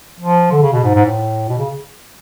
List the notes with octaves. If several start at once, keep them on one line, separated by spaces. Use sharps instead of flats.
F3
D3
C#3
B2
G#2
G#2
A2
B2
C#3